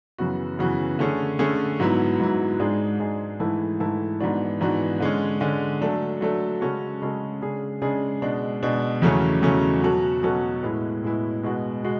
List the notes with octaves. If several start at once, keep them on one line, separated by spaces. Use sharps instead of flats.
F#2 C#3 E3 B3 F#4
F#2 C#3 E3 B3 F#4
D3 A3 C#4 G#4
D3 A3 C#4 G#4
G#2 F#3 B3 E4
G#2 F#3 B3 E4
G#2 G#3 D4 G#4
G#2 G#3 D4 G#4
G#2 E3 A3 E4 A4
G#2 E3 A3 E4 A4
G#2 E3 B3 D4 F#4
G#2 E3 B3 D4 F#4
D3 G#3 C#4
D3 G#3 C#4
F#3 A3 D4 A4
F#3 A3 D4 A4
C#3 G#3 C#4 F#4 A4
C#3 G#3 C#4 F#4 A4
C#3 G#3 D4 G#4
C#3 G#3 D4 G#4
B2 G#3 D4
B2 G#3 D4
E2 C#3 F#3 A3 C#4
E2 C#3 F#3 A3 C#4
B2 F#3 C#4 F#4 A4
B2 F#3 C#4 F#4 A4
A2 G#3 B3 E4
A2 G#3 B3 E4
B2 G#3 B3 F#4
B2 G#3 F#4